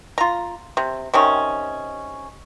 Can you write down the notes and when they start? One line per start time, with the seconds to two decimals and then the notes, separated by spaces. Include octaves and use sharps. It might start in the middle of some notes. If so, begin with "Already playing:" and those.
0.18 F4 A#5
0.77 C3
1.14 C3 D#3 C#4